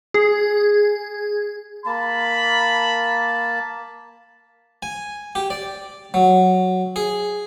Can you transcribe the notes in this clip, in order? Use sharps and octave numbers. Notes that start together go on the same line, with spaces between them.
G#4
A#3 A5 B5
G#5
G4
D5
F#3
G#4